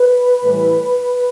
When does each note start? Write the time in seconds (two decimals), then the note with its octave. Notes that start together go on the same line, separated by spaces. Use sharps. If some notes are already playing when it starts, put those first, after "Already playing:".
Already playing: B4
0.42 A2 E3 G3